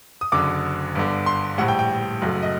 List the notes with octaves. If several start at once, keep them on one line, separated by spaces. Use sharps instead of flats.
D#6
F#1 F#2 D3 D6
G1 G2 D3
C6
A#1 A2 G3 F#5
G5
G5
F#1 F#2 F#3 A3
D#5